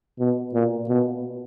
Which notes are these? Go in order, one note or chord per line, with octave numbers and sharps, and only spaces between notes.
B2
A#2
B2